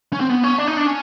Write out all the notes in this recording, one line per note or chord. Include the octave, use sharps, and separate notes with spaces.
C#4
C4
B3
C#4
D4
D#4
D4
C#4